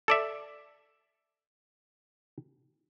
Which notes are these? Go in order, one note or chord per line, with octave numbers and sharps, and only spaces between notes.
A4 D5 E5